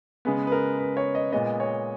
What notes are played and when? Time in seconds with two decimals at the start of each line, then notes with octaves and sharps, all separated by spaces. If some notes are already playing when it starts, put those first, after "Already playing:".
0.25 C#3 G#3 B3 B4
0.47 B4
0.52 A#4
0.79 B4
0.97 C#5
1.15 D#5
1.32 A#2 G#3 B3 D#5
1.60 C#5